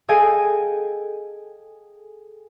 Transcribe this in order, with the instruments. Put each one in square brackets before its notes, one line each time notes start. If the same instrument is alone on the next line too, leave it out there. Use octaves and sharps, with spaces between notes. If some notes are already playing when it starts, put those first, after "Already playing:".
[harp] G#4 A4 D#5 F5 G5 G#5